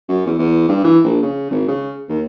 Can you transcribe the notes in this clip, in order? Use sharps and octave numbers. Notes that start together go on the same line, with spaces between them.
F#2
E2
E2
G2
E3
A#1
C#3
G#1
C#3
D#2